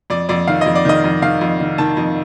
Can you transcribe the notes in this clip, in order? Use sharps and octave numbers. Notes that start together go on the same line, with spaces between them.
F2 D5
F2 D5
D#3 F5
F2 D#5
D5
D#3 D#5
F2
D#3 F5
F2
D#3
D#3 A5
F2